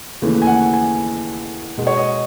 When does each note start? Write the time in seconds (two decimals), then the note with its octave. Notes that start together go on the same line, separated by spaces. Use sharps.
0.22 D#2 C#3 E3 A3
0.42 G#5
0.47 F#5
0.73 G#5
1.78 B2 G#3 B3
1.87 C#5
1.97 D#5